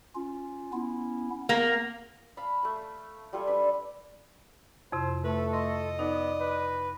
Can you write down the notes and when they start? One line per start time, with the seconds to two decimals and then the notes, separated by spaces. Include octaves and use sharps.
0.15 C#4 F4
0.73 B3 C#4 E4
1.49 A#3 B3
2.37 F5 A5 B5
2.63 A3 A5
3.33 G3 F4 A4 G#5
3.47 D4 B4 E5
4.92 F2 C3 E4 C5
5.24 A3 A4 B4
5.53 D#5 C6
5.99 B3 D#4 D5
6.40 B4